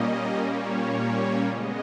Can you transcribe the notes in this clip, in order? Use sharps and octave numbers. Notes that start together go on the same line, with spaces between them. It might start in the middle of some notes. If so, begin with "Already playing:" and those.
Already playing: A#2 G3 A#3 C#4 D#5
C#5
C#3 G#3 B3 D#5